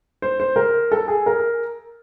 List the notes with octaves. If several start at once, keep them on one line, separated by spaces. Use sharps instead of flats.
C5
C5
A#4
A4
G#4
A#4